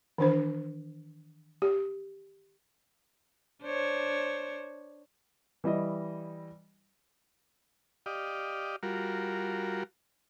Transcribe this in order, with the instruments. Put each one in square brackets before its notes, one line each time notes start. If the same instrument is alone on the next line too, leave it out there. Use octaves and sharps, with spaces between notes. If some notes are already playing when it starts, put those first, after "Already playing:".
[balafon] D#3 E3 D4 C5
G4
[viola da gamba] D4 C5 C#5
[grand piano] E3 G3 E4 D#5
[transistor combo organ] G4 D5 D#5 F5
G3 F4 F#4 A#4